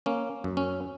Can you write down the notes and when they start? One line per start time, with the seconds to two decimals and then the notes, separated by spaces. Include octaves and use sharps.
0.06 A#3 C#4
0.44 F#2
0.57 C#4